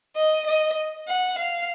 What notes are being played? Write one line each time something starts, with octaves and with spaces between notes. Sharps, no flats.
D#5
D#5
F#5
F5